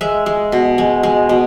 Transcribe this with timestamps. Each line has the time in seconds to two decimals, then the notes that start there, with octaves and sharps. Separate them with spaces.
0.01 G#3 E5
0.26 G#3
0.52 B2
0.78 G#3
1.03 G#3
1.29 B2